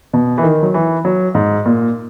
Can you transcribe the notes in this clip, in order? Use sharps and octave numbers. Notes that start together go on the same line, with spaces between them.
B2
E3
D#3
F#3
E3
F#3
G#2
A#2